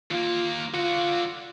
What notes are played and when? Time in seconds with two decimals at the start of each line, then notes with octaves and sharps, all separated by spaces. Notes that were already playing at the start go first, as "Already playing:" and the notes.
0.11 D#2 A#3 F4
0.74 D3 F4 F#4